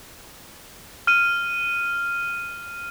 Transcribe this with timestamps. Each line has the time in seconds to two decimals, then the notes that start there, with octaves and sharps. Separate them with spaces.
1.07 F6 D#7